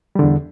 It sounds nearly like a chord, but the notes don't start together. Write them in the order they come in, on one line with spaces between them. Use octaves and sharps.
G3 D3 E2